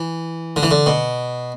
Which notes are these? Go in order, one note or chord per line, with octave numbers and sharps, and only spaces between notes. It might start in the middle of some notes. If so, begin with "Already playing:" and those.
Already playing: E3
D3
E3
D3
B2